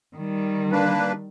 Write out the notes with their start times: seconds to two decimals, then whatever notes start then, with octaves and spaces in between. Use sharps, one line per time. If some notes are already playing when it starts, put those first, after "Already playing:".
0.16 D#3 G3
0.72 A#3 D4 B4